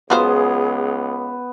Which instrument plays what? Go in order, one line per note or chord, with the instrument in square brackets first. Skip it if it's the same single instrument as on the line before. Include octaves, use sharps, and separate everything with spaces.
[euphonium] C#2 [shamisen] F#3 F4 C5 [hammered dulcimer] B3 [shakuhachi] G#4